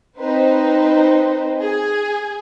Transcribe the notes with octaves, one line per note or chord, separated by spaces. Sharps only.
C4 D#4 B4 C5
G#4 G#5